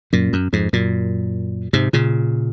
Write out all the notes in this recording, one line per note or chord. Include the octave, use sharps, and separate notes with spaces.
F#2 A#2
F#2
F2 G#2
F#2 A#2
G#2 C3
A#2 C#3